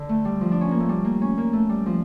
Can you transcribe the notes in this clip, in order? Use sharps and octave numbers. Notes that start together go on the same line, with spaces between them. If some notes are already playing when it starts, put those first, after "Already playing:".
Already playing: D3
A3
G3
F3
D4
C#4
A#3
A3
G3
A#3
C#4
A#3
A3
G3
F3